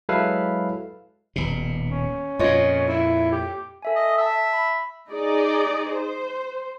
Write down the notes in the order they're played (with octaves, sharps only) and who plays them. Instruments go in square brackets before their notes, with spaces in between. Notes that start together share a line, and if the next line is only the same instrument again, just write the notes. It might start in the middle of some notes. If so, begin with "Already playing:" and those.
[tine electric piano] F#3 G#3 E4 A4 B4 F5
[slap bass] D#1 B2
[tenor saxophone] C#4
[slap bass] F2 A#2 [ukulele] F4 C#5 D#5
[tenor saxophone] E4
G4
[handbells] A4 E5 G#5
[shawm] D#5
[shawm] E5 [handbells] A5 E6
[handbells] B5
[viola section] D#4 G#4 D5 D#5
C5